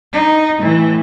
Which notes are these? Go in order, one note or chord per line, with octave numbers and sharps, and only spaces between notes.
D#4
A2 E3